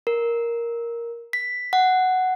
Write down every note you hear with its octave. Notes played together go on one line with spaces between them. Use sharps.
A#4
B6
F#5